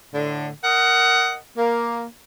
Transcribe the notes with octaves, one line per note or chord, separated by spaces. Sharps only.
A2 D3
A#4 D#5 F#5
A#3